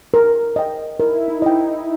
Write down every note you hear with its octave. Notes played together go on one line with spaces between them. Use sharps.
A#4
D#5 G5
E4 A#4
D#4
D#5 G5